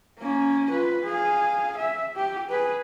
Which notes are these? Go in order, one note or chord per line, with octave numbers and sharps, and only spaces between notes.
A#3 C#4
F4 B4
G#4 F5
E5
G4
G#4 B4